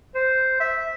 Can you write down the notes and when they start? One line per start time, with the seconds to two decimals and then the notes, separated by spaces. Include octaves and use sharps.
0.15 C5
0.60 E5